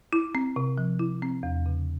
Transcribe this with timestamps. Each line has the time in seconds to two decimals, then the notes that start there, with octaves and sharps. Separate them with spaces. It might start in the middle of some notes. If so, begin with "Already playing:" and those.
0.13 E4
0.35 C4
0.56 C3
0.78 F3
0.99 E4
1.22 C4
1.43 E2
1.66 C#3